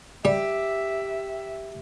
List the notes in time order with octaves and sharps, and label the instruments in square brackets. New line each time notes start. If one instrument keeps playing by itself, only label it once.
[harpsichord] G3 [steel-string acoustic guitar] G4 [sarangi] E5